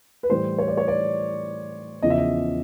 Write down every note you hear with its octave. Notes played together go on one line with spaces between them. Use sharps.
B4
A2 E3 G3 C5
C#5
D5
C#5
D5
E2 C#3 F3 D#5
E5
D#5